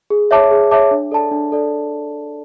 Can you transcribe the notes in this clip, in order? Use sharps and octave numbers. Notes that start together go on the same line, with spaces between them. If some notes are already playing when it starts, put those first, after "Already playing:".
G#4
C#5 E5 A5 D6
G#4
C#5 E5 A5 D6
D4
A4 D5 A5
D4
A4 D5